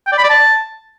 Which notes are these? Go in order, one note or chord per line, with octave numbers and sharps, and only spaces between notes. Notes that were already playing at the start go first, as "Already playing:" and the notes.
G5
D5
B5
D5
A5